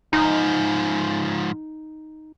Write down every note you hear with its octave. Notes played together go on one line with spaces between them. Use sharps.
G#2 F3 D#4